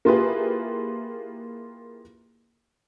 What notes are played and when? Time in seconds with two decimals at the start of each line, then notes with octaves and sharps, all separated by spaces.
0.05 A#3 E4 F4 G4 G#4 B4